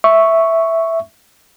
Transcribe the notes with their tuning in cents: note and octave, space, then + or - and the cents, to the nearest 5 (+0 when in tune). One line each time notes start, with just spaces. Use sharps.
E5 +0 C#6 +0